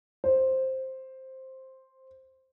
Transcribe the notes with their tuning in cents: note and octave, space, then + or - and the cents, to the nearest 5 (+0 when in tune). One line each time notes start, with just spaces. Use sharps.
C5 +5